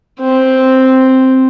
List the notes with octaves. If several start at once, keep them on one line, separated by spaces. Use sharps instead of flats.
C4